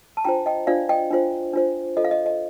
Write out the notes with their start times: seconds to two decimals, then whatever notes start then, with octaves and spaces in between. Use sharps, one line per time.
0.17 A5
0.25 D4 F4 C5 G5 A#5
0.46 D#5 G5
0.67 D4 F4 C5 D5 F5
0.89 D#5 G5
1.11 D4 F4 C5
1.54 D4 F4 C5
1.97 F4 A4 C5 D#5
2.04 F5
2.11 D#5
2.26 D#5